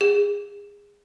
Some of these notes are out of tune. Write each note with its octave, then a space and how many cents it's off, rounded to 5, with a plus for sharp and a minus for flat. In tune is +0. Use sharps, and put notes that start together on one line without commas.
G#4 -25